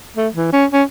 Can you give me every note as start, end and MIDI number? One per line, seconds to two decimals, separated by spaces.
0.16 0.28 57
0.35 0.49 52
0.53 0.65 61
0.73 0.83 61